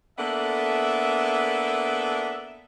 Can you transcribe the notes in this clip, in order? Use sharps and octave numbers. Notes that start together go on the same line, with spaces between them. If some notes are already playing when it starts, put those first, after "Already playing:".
A#3 B3 D4 A4 E5